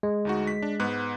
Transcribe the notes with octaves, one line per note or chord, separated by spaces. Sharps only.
G#3
D2 D#4 F#4
B6
D4
G#2 B3 F#6